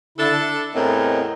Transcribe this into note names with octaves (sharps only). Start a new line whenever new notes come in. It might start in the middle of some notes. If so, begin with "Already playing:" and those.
D3 D4 E4 A4
A5
E2 A2 C4 A#4 D#5